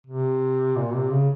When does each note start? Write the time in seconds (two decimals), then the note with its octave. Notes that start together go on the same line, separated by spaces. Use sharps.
0.07 C3
0.77 A#2
0.94 C3
1.11 C#3